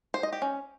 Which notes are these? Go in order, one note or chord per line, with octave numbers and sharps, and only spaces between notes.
C5
D#5
G4
C#4